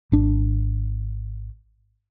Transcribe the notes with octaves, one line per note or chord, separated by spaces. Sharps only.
G#1 D4